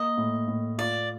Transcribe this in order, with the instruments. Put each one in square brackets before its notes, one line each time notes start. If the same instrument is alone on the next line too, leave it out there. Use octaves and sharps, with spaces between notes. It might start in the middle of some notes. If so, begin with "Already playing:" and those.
Already playing: [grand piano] A#3 [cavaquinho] D#5
[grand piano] A2
A2
[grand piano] F4 [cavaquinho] D5